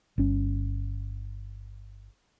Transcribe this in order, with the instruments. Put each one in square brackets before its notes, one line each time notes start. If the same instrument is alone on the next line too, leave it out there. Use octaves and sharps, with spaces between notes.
[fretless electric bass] G1 C#4